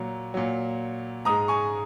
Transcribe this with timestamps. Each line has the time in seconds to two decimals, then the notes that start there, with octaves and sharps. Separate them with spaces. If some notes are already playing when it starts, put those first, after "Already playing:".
Already playing: A#2 F#3 A#5
0.34 A#2 F#3
1.25 G#2 G#3 A#5 D#6
1.48 G#5 C#6